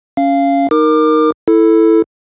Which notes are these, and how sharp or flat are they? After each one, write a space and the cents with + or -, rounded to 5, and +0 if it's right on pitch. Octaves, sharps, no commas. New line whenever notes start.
C#4 +10 F5 -15
D#4 +0 A#4 +0 D6 +30
E4 +0 A4 +0